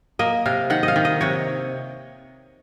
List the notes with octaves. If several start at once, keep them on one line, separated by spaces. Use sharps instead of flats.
A#3 D#5
C3 F5
D#3 F#5
D#5
F5
D#3
D#5
C3 C#5